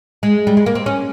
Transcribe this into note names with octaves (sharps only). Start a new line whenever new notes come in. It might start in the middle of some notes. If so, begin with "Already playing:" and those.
G#3
G3
G#3
A#3
C4
C#4